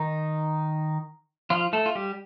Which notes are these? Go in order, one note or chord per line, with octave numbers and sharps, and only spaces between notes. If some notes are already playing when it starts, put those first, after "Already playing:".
Already playing: D#3 D#4
F3 F4
A3 A4
F4
G3 G4